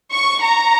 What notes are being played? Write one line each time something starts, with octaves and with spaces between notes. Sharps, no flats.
C#6
A#5